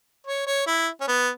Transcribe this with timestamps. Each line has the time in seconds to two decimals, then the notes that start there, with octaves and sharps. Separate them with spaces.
0.27 C#5
0.47 C#5
0.67 E4
1.01 C#4
1.08 B3